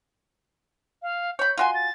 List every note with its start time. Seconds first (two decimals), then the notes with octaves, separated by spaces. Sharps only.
1.02 F5
1.39 C#5 B5 G6
1.57 F4 F#4 G#5 C6
1.74 A6